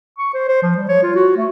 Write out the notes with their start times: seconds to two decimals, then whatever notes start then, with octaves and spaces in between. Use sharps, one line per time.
0.18 C#6
0.34 C5
0.49 C5
0.63 F3
0.76 G3
0.89 C#5
1.03 F4
1.16 F#4
1.37 A3